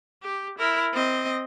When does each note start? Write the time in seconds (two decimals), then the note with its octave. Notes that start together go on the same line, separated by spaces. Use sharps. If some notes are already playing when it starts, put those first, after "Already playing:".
0.23 G4
0.59 E4 A#4
0.93 C4 D#5